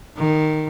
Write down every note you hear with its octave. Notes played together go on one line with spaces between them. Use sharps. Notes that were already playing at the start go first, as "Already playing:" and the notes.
D#3